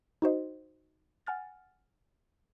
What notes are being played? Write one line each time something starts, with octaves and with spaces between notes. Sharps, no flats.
D#4 F#4 C5 D#5
F#5 G#5 F6 A6